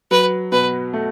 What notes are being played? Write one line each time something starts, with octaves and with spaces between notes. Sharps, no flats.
F#3 B4
B2 B4
A3